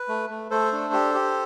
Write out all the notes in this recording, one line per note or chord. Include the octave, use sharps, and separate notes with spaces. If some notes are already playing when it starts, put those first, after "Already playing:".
Already playing: B4
A3
A3
A3 A4 C5
D4
G4
G4